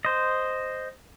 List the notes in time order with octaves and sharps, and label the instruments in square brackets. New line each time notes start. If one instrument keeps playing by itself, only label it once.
[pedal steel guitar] C5 D#5